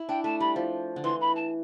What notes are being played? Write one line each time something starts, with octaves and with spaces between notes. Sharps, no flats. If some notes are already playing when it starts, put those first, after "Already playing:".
Already playing: E4
D4 G5
A3 A5
G3 B5
F3
D3
E3 C6
B5
A5